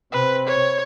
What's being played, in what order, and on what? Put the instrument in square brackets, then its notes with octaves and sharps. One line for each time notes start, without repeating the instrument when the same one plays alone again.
[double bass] C3 C4 [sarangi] B4
[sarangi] C#5